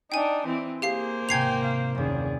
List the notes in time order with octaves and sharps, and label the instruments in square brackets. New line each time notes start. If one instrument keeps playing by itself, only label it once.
[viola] D4 D#4 [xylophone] G5 G#5
[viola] E3 C4
[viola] A#3 C5 [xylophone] G4 F5 C7 [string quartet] G#4
[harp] G#1 C3 [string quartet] G5 G#5 A#5 [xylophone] G#6 C7 F7
[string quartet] F5
[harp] F#1 D#2 [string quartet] C#4 G#4 D5